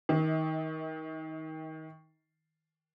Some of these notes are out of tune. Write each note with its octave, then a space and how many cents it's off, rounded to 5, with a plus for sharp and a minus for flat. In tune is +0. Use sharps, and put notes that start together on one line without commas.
D#3 +25 D#5 +45 D6 +35